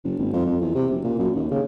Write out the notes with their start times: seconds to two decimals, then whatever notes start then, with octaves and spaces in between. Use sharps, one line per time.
0.04 F#1
0.19 G#1
0.33 F2
0.46 F2
0.61 E2
0.75 C3
0.91 F#1
1.04 A#2
1.19 F#2
1.36 D#2
1.51 C#3